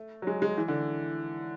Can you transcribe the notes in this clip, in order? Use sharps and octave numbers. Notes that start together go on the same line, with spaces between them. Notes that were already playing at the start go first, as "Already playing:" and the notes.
Already playing: A3
F#3
G#3
G#3
E3
D3